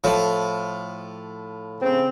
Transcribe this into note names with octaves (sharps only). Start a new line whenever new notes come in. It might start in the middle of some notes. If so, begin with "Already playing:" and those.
A2 F3
C#3 C4